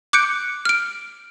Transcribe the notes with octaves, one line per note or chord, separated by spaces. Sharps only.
D6 F#6 G6 C#7 D7
F6 D7